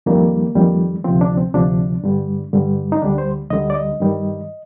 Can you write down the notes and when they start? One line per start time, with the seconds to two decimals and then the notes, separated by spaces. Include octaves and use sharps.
0.06 F2 D#3 G3 A#3
0.55 F2 D#3 G3
1.04 D2 C3 F3 C4
1.21 D4
1.37 C4
1.54 D2 C3 F3 D4
2.04 G2 D3 G3
2.53 G2 D3 G3
2.92 D#4
3.02 D2 D3 G3 D4
3.18 C5
3.50 D2 D3 G3 D#5
3.70 D5
3.75 D#5
4.00 G2 D#3 G3